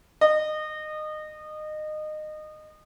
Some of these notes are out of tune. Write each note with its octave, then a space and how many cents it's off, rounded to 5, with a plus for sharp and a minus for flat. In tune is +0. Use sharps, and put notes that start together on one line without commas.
D#5 -25